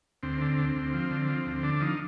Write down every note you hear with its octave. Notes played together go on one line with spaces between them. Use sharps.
D2 C4
D3
D2
D2
F3
D3
F3
D2
D3 D4
F3 D#4